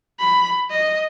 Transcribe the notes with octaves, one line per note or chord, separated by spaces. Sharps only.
B5
D#5